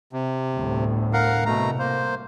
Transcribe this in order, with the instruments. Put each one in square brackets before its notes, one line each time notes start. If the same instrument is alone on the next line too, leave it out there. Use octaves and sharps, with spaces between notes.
[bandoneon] C3
[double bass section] G1 D2 A2
[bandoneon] A#4 F5 F#5
[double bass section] C2 [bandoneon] B2 A3 A#5
[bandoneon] A#3 C5